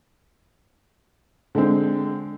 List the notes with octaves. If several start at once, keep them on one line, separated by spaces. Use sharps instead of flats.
D3 G#3 C4